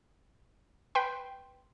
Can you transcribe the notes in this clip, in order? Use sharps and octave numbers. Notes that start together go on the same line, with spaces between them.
B4 G5 C6